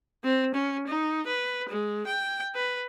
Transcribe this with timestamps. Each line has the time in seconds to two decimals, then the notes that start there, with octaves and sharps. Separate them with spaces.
0.24 C4
0.54 C#4
0.88 D#4
1.27 B4
1.69 G#3
2.07 G5
2.55 B4